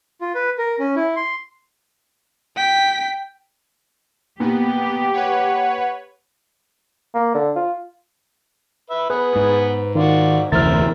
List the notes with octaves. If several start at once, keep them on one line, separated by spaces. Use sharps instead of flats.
F4
B4
A#4
C#4
E4
C6
G5 B6
A#2 B3 G4
B4 C#5 F#5
A#3
D3
F4
B4 E5
B3 G#4 B4
G#2
D#3 F4 F#4 D5
F1 D2 E3 A#4 C5 E5 F6 A6